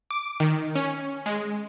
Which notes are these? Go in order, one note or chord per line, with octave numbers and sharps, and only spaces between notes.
D6
D#3
C#4
G#3